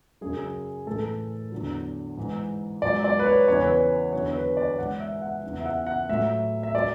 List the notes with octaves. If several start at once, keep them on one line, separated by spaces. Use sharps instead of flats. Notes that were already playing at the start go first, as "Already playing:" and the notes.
F#2 C#3 F#3 G#4
A2 E3 A4
E2 D3 F#3
G#2 E3
G#2 F#3 D5
D5
B4
C#5
E2 C#3 E3 C#5
B4
C#5
E2 D3 F#3 C#5
C#5
B4
D5
G#2 E3 F#5
E5
F#5
E2 C#3 E3
E5
F#5
F#5
A2 F#3 E5
E5
F#3 D5